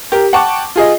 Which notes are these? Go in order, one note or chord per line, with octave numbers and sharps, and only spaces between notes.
G4 A#4
F#5 G5 A5 C#6 D6
F4 G#4 D#5